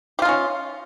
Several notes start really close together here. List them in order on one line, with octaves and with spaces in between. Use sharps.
G4 F4 D#4 C#4